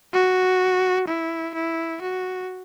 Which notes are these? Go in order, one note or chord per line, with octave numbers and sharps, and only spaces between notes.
F#4
E4
E4
F#4